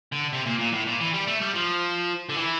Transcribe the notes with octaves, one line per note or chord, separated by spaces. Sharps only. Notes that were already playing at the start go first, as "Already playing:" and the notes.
D3
C3
A#2
A#2
A2
A#2
E3
G3
A3
G3
F3
D3
E3